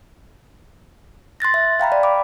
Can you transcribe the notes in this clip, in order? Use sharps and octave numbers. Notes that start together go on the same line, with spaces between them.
C6 F#6 A6 A#6
E5
F5 G5 A#5 B5
D5
B5 D6